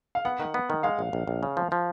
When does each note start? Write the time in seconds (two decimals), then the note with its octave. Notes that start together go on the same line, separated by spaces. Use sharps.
0.15 F5
0.25 B3 F#5
0.40 D#3
0.54 B3
0.70 D#3
0.83 G#3 F5
0.99 A#1
1.13 A#1
1.27 A#1
1.43 C#3
1.57 F3
1.72 F3